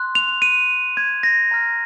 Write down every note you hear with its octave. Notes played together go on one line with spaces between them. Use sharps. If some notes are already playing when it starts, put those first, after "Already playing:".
Already playing: C6 F#6
F7
D#7
G#6
A#6
A#5 F6